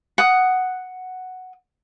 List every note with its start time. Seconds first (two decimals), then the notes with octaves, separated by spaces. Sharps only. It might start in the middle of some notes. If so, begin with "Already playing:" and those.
0.18 F#5 D#6